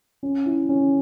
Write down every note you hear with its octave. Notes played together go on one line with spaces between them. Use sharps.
C#4
E4
C#4